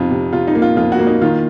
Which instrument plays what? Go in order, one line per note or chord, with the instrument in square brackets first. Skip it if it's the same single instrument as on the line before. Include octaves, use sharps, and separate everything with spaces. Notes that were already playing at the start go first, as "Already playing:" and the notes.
Already playing: [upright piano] F2 C3 D#4 F4
C3
C3 F4
D#4
A#3
F4
F2 F4
F#4
A#3
D#4
D#3 F4